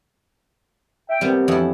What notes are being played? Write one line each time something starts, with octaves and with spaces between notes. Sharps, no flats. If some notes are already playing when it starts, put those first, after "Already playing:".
E5 G5
C2 A#2 G3 B3 C4
F2 A2 D3 E3 E4